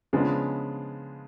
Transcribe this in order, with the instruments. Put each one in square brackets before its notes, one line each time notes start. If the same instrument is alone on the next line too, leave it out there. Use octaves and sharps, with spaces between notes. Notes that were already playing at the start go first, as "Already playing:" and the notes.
[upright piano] C#3 F3 G#3 B3 D4